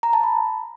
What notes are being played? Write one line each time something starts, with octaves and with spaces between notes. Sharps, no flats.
A#5
A5
B5